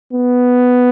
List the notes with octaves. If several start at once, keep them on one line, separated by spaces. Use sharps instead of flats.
B3